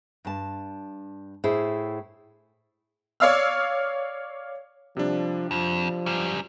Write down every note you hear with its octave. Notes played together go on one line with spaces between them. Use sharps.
G2 A5
A2 E4 G#4 C5
C#5 D5 F5 E6 F6
C3 F3 G3 D4
F2 F3
F#2 G3